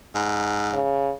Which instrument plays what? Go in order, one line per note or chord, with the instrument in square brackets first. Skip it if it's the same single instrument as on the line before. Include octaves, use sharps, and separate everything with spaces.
[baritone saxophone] G#2
[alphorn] C#3